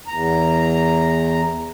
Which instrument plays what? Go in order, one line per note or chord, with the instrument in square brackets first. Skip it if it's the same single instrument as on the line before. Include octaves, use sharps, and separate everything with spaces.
[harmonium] E2 A#5